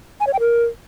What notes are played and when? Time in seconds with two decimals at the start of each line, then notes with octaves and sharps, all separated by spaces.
0.20 G#5
0.27 C#5
0.33 G5
0.40 A#4